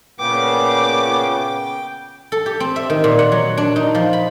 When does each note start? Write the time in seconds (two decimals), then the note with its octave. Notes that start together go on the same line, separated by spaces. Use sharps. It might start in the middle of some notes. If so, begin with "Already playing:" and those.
0.20 A#2 C#3 B3 G5 D6
2.32 A4
2.46 G4
2.60 C4
2.76 E5
2.90 D#3
3.04 A#2
3.19 F#5
3.32 F#3
3.57 D4
3.76 D#4
3.95 F3
4.13 B5